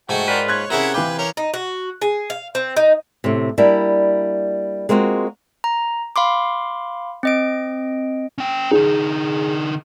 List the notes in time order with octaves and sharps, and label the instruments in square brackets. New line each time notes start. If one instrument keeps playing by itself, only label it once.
[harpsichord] G#2 G#5 [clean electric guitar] A3 [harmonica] F#4 G5
[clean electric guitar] F4 B4 [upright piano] G#4 A#4 D5
[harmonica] C#5 [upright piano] C6 F#6 G#6
[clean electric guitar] C3 [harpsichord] C#4 G#4 A#4 [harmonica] E4 F#5
[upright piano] E3 F5 D6 [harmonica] B4 [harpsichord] G5
[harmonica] C#4 A#4
[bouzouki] D#4
F#4
G#4
F5
C4
D#4
[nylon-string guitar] A2 C3
G3 A#3 D4 E4
G#3 A#3 C4 F4 F#4
[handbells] A#5
F5 B5 C6 D6
C4 D#5 D7
[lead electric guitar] C#4 G5
[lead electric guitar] D3 D#4 [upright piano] G#4